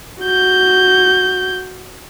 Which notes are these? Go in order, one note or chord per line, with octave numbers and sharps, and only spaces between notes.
F#4 G6